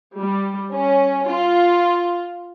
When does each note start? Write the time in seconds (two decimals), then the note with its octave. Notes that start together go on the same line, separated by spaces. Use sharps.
0.19 G3
0.74 C#4
1.30 F4